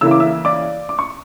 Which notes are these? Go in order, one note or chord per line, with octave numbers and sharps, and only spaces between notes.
C#3 E3 A#3 E4 E6
D6
E5 E6
D5 D6
D6
C#6